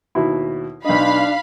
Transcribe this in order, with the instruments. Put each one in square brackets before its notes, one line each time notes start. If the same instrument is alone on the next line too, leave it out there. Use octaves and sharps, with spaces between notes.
[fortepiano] D#2 B2 E4
[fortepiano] B1 D#5 [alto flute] D4 [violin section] F5 B5